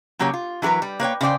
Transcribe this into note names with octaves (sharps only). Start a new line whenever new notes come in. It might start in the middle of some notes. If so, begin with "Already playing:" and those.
C#3 F#3 A#3 G4 C#5
F4
E3 F#3 G#4 A#4 B4
G3
A#3 B4 C#5 G5
C#3 C5 D5 G5